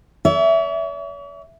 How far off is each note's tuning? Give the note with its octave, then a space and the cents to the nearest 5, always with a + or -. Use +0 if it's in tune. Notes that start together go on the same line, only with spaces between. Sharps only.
C#5 +45 E5 +0